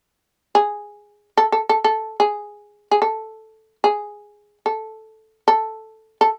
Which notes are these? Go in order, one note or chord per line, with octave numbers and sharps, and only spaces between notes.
G#4
A4
A4
A4
A4
G#4
G#4
A4
G#4
A4
A4
A4